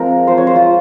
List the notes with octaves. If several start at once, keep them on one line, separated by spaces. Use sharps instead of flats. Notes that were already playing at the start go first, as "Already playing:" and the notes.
Already playing: F3 G#3 C4 A#4
F3 G#3 C4 C5
C#5
C5
F4